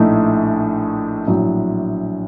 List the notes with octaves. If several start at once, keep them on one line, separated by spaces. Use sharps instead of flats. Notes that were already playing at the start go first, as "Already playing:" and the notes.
Already playing: A#1 A2 A3 D#4
A#1 A2 F#3